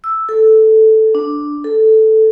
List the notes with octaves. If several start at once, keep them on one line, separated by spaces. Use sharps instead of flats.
E6
A4
D4
A4